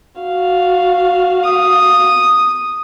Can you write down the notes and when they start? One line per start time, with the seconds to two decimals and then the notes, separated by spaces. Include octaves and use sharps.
0.21 F#4 F5
1.44 D#6